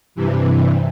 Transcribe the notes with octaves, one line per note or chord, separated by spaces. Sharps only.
G2 C3 E3